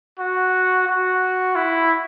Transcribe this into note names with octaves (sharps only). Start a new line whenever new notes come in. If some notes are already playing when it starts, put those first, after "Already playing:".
F#4
F#4
E4